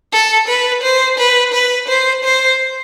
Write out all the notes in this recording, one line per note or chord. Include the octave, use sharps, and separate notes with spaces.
A4
B4
C5
B4
B4
C5
C5